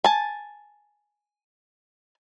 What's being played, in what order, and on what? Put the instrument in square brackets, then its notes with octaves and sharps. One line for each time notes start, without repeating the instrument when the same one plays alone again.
[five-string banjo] G#5 A5